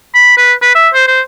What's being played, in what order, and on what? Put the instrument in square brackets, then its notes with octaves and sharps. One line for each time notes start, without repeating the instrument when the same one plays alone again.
[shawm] B5
B4
B4
E5
C5
C5